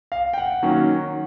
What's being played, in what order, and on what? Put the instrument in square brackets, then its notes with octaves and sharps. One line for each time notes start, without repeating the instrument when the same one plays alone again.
[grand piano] F5
G5
F#5
D#3 F#3 A#3 C#4